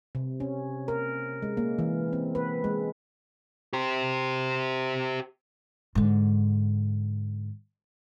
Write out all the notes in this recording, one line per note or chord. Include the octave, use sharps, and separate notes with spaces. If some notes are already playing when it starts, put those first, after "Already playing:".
C3
C#4
A#4
G#3
A#3
E3
C4
B4
G#3
G4 C5
G#2 D3